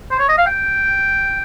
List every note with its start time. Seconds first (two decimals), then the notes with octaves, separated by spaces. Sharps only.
0.11 C5
0.19 C#5
0.29 D#5
0.38 F5
0.47 G5